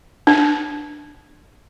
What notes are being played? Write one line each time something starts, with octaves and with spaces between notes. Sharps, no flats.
D4